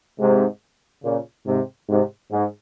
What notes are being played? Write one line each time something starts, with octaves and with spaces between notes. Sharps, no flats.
G#2 C3
A#2 C#3
G#2 C3
G#2 C3
G#2